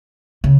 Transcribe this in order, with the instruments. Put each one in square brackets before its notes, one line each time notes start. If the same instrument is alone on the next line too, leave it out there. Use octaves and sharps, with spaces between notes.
[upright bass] C#3